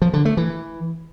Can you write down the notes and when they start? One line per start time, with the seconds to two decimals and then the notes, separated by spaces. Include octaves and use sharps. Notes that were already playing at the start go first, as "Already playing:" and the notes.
0.02 F3
0.13 D3
0.25 A3
0.37 E3